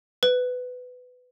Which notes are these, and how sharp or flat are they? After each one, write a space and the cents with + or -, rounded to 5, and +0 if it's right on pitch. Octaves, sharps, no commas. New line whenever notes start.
B4 +15